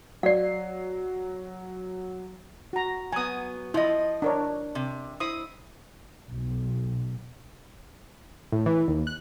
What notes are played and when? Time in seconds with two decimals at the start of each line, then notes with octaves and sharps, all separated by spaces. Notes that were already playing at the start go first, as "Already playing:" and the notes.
0.23 F#3 D5 F5 C7
2.73 F#4 A#5
3.12 F#3 B3 G#5 D#6
3.74 F3 E4 D#5
4.22 D4 A#4 C#5
4.75 C3
5.20 E4 C5 D#6
6.32 B1
8.52 A2
8.66 E3
8.88 D#2
9.07 F#6